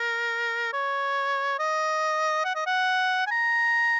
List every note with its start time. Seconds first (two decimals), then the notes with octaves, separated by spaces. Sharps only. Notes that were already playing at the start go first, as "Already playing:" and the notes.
Already playing: A#4
0.73 C#5
1.59 D#5
2.45 F#5
2.55 D#5
2.66 F#5
3.27 G#5
3.31 A#5